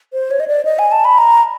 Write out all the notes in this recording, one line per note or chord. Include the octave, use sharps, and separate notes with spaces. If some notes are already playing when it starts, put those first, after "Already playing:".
C5
C#5
D#5
D5
D#5
G#5
A5
B5
A#5